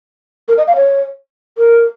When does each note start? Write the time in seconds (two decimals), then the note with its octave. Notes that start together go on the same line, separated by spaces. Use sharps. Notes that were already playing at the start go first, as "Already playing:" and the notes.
0.48 A#4
0.58 D#5
0.67 F5
0.76 C#5
1.58 A#4